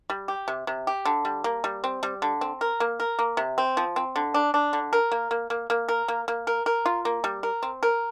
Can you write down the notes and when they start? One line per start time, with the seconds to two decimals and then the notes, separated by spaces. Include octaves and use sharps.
0.10 G3
0.28 G4
0.48 C3
0.67 C3
0.87 G4
1.05 D3
1.25 G3
1.44 A#3
1.64 G3
1.84 C4
2.03 G3
2.22 D3
2.41 C4
2.61 A#4
2.80 A#3
3.00 A#4
3.19 A#3
3.37 C3
3.58 C4
3.77 F3
3.96 C4
4.16 D3
4.34 D4
4.54 D4
4.73 D3
4.93 A#4
5.12 A#3
5.31 A#3
5.50 A#3
5.70 A#3
5.89 A#4
6.08 A#3
6.28 A#3
6.47 A#4
6.66 A#4
6.86 F4
7.05 A#3
7.24 G3
7.43 A#4
7.63 C4
7.83 A#4